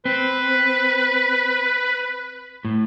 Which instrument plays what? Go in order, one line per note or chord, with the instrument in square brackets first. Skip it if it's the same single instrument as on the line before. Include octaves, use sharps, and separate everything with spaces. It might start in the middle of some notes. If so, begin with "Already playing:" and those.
[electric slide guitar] C4 [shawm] B4
[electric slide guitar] A2